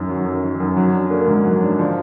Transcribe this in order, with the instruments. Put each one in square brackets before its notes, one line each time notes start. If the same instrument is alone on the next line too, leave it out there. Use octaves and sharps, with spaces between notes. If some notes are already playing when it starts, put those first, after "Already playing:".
Already playing: [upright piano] F#2 D#3
F#3
F#2
D#3
F#2
F#3
D4
A#3
G#2
F#3
D4
F3